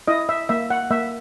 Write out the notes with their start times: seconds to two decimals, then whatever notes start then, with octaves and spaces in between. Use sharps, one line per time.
0.08 E4 D#5
0.29 E5
0.49 A#3 E5
0.70 F#5
0.91 A#3 E5